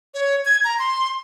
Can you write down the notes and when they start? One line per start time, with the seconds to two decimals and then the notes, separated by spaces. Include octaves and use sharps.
0.14 C#5
0.45 G#6
0.64 A#5
0.79 C6